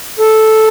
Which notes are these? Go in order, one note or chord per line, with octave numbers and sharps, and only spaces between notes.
A4